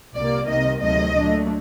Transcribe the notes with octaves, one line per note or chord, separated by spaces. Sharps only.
C2 A#2 G3 A#3 D5
C2 C3 D#3 D#5
D2 C3 D#3 F#3 A3 D#5
A#2 F#3 A3 D4